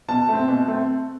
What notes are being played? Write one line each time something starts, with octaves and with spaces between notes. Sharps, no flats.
B2 A5
A3 C4
B2
A3 C4